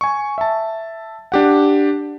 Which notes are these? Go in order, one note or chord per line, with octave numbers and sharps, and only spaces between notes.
G#5 C#6
E5 A5
D4 G4 F#5